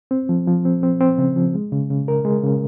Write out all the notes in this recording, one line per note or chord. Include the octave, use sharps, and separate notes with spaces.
C4
F3
F3
C4
C4
C4
C#3
F3
G#3
C#3
C#3
A#4
G#3
C#3